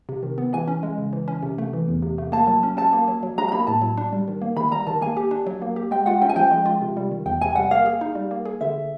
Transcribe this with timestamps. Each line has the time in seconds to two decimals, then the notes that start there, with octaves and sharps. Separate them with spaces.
0.09 C3
0.23 D#3
0.38 B3
0.53 E3 G#5
0.68 C#4
0.83 G#3
0.98 C#3
1.13 E3
1.28 C#4
1.43 C3
1.58 A3
1.73 E3
1.88 E2
2.02 C3
2.18 A3
2.32 A#3 A5
2.47 F#3
2.63 C#4
2.77 F#3 A5
2.93 A#3
3.08 F#3
3.23 F#3
3.38 D4 A#5
3.48 A#5
3.52 A#3 B5
3.67 A2 A5
3.82 F#3
3.98 D4
4.13 G3
4.28 D#3
4.42 A#3
4.56 D#3 B5
4.71 G3 A#5
4.87 D#3 A5
5.01 A#3 G#5
5.17 G4
5.31 D4
5.47 F#3
5.62 A#3
5.76 G4
5.91 G#3 G5
6.06 F4 F#5
6.22 C#4 G5
6.29 G#5
6.36 F3 G5
6.51 G#3
6.66 F4
6.82 C3
6.97 G3
7.12 D#3
7.26 E2 G5
7.41 C3 G#5
7.55 G3 F#5
7.71 A#3 F5
7.86 G#4
8.01 D#4
8.15 G3
8.31 A#3
8.45 G#4
8.61 D3 E5